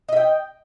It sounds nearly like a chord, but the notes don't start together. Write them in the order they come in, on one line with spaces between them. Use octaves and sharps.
D#5 E5 G5